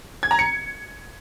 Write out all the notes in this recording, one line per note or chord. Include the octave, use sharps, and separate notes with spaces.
G#6
A#5
C#7